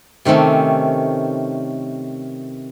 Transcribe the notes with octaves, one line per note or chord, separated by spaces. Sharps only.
C3 D#3 A3 C4 C#4